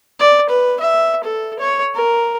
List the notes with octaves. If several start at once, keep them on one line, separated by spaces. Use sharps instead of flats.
D5
B4
E5
A4
C#5
A#4